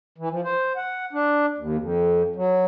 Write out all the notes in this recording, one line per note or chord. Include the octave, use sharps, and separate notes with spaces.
E3
F3
C5
F#5
D4
D#2
F2
F#3